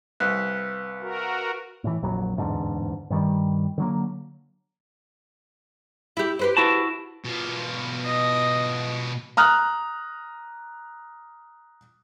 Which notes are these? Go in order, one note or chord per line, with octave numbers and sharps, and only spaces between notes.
C2 B4 F5 F#6 B6
F#4 A#4
A2 E3
A#1 F2 F#3
D1 E2 G#2 D3
G2 D#3 G3
D3 F#3 A#3
E4 G4
G4 B4 C5
E4 F#4 A5
B2 F4
D#5
A#5 D#6 F6 F#6